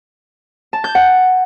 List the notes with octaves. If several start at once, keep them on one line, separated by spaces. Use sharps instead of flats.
A5
G6
F#5